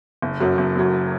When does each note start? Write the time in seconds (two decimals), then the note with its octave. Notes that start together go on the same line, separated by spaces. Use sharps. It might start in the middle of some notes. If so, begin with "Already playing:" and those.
0.22 F#1
0.40 F#2 F#3
0.58 F#1
0.76 F#2 F#3